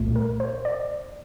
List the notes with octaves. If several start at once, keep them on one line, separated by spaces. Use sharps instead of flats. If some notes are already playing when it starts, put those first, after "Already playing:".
Already playing: C2 A#2 A3
A#4
C5
D5